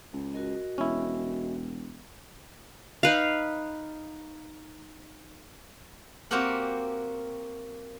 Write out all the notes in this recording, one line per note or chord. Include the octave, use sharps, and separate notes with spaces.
C#2
F#4 A#4 D#5
E1 C#4 E4
D#4 B4 F5
A#3 C4 F#4 G4 A#4 F#5